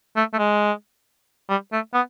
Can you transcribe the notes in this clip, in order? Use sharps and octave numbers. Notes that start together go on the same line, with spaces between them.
A3
A3
G#3
G3
A3
B3